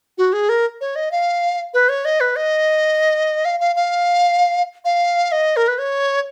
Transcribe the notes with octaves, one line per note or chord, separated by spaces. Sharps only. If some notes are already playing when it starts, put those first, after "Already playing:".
F#4
G#4
A#4
C#5
D#5
F5
B4
C#5
D#5
B4
D#5
F5
F5
F5
F5
D#5
A#4
B4
C#5